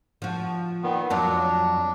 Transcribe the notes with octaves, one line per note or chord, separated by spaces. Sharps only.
F3 F#4
A#2 D#3 B3
F2 F#3 D4 F4